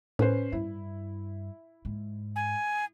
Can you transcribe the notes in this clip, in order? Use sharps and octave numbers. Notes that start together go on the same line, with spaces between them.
A2 C#4 B4 C5
G2 E4
G#2
G#5